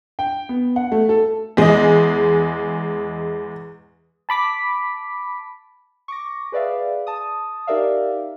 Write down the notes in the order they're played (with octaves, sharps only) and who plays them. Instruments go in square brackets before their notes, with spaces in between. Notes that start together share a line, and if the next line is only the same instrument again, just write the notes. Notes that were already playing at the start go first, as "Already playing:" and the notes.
[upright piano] G5
B3
F#5
A3
A4
[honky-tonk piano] E2 G#3 [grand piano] G#4 D#5
[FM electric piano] A5 B5 D6 B6
[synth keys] C#6 D6 A#6
G#4 B4 D5 E5 F5
A5 D#6
D#4 G4 A#4 D5 E5 F5